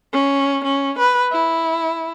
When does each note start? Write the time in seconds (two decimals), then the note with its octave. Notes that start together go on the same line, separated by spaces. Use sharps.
0.13 C#4
0.64 C#4
0.98 B4
1.32 E4